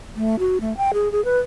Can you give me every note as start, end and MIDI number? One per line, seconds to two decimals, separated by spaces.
0.16 0.39 57
0.39 0.58 66
0.61 0.76 57
0.77 0.91 79
0.94 1.11 68
1.12 1.23 68
1.25 1.39 71